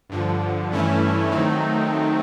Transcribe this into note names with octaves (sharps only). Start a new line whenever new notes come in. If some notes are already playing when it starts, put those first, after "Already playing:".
G2 D3 F3
G2 E3 A3 C#4 E4
D#3 F#3 A3 C4 D#4